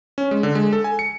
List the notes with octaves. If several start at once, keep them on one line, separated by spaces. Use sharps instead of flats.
C#4
G#3
D3
G#3
A4
G#5
C#7